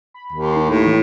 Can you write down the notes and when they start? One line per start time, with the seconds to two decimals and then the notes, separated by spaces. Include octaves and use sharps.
0.14 B5
0.32 D#2
0.44 C6
0.56 D#4
0.69 A2
0.86 E3